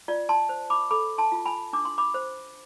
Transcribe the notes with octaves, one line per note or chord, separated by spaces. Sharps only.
F4 D5
A5 C6
C5
B5 D6
A4 B5 D6
A5 C6
F4
G#5 B5
D4 D6
C6
B5 D6
C5